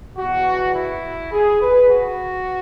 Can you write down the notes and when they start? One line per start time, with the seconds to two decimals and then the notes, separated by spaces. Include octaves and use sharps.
0.18 E2 B2 F#4
0.75 E4
1.32 G#4
1.61 B4
1.90 F#4